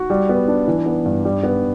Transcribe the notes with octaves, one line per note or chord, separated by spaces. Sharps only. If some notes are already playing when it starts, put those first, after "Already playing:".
Already playing: F#4
G3
B3
D4
E3
B3
G2
G3
B3